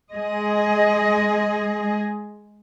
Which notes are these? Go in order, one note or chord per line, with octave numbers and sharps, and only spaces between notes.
G#3 G#4 D#5